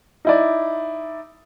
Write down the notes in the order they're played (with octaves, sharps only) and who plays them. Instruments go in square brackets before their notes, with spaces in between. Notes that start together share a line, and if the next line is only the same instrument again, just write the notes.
[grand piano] D#4 E4 D5